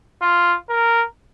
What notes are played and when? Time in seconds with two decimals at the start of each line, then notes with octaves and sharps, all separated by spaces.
0.22 F4
0.69 A#4